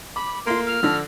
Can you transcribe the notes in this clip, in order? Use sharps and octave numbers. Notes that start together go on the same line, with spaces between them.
B5 D6
A3 A#3 F4 C6
F6
D3 F3 D4 A#6